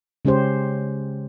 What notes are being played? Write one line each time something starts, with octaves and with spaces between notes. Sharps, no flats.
C#3 G#3 C#4 G4 C5